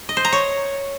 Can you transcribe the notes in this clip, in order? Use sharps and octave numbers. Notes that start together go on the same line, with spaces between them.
D#5
C5
A#5
C#5